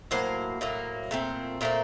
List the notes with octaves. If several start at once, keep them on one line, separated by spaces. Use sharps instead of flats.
A2 F#3 A#3 C5
A2 F#3 A#3
A#2 A3 C4
A#2 A3 C4 A#4